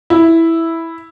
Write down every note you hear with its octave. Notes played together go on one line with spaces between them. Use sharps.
E4